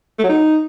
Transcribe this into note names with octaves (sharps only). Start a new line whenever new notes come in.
A3
F#3
D#4